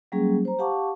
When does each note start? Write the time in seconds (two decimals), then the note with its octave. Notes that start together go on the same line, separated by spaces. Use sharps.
0.12 F#3 G3 A#3 C#4 G#4
0.45 C5 A#5
0.59 G4 F5 F#5 A5 C#6 D6